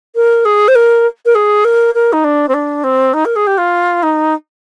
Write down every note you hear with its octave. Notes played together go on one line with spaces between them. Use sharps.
A#4
G#4
C5
A#4
A#4
G#4
A#4
A#4
D#4
D4
C4
D4
C4
D#4
A#4
G#4
G4
F4
D#4